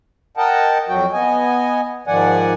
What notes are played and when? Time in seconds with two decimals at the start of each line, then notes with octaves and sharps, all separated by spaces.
0.37 A#4 D#5 F#5 G5 A5
0.88 F2 F#3 F#4 G5
1.13 B3 D#5 G#5
2.07 G#2 D#3 F3 D5 F#5 G#5